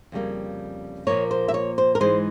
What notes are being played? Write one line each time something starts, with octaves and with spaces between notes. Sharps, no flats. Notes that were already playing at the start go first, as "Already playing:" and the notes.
F2 C#3 G3 A#3
A#2 F3 A#3 C#5
C5
E5
C#5
C5
A#4
G#2 E3 G#3 C5